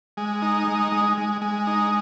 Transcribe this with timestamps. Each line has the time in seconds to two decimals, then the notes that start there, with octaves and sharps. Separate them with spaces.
0.17 G#3
0.42 D#4
0.68 G#3
0.92 G#3
1.18 G#3
1.42 G#3
1.67 D#4